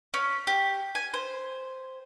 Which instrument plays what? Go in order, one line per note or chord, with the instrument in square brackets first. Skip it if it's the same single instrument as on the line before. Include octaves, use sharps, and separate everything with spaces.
[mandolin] C#4
G4
G#5
C5